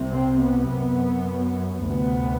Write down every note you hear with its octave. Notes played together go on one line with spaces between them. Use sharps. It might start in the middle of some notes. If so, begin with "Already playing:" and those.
Already playing: C2 C3
C4
B3
F#2
D2 C3 B3